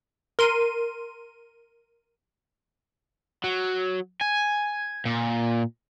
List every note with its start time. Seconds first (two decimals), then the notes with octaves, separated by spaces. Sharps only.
0.39 A#4 C6 D#7
3.44 F#3
4.21 G#5
5.06 A#2